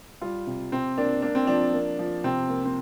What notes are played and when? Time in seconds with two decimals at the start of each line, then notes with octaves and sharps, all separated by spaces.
0.22 G3 F4
0.47 C3
0.72 C3 C4
0.98 A#3 D4
1.22 A#3 D4
1.35 C4
1.47 F3 D4
1.74 A#3
1.99 F3
2.24 C3 C4
2.49 A#3
2.65 C4